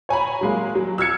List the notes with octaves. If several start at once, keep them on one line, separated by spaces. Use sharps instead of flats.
C#5 G#5 A#5 B5
F#3 G#3 A#3
F#3
E6 F6 G#6 C#7